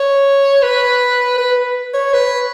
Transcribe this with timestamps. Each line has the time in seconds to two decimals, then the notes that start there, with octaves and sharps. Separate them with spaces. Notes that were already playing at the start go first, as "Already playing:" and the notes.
Already playing: C#5
0.62 B4
1.38 B4
1.94 C#5
2.13 B4